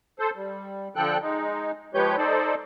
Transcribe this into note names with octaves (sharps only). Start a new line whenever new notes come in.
A4 C5
G3
D3 F3 A4 G5 F#6
G#3 D#4
F3 G#3 G4 B4 C#5 G6
D#4 A4 C5 D5